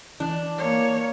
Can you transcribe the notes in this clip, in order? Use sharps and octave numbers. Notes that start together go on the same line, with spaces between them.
E3 D4
A#3 C#5